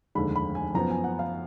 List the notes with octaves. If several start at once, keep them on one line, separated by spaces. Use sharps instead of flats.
F1 D#2 D3 G#3 B5
B5
G#5
F#2 F3 B3 A#5
G#5
F#5
F5